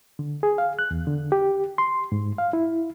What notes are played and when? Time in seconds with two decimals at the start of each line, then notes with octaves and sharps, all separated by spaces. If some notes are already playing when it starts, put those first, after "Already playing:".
0.19 D3
0.43 G#4
0.58 F5
0.79 F#6
0.91 E2
1.07 D3
1.32 G4
1.78 C6
2.12 G#2
2.38 F5
2.53 E4